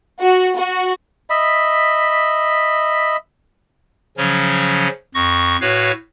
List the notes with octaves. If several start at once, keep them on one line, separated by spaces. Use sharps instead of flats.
F#4
F#4
D#5 E5 B5
C#3 F3 F#3 C#4
F2 C#6 A#6
A2 F#4 B4 C#5 F5